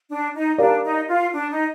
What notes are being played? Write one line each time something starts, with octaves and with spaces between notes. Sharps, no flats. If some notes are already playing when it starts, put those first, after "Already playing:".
D4
D#4
D4 G4 A#4 D5 F5
D#4
F4
D4
D#4